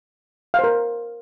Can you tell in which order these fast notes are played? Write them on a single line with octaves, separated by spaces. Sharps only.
F5 C5 A#4